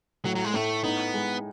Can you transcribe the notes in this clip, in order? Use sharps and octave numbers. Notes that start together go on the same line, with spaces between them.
A2 F#3
F#3
G#3
A2 A3
B3 D#4
G#3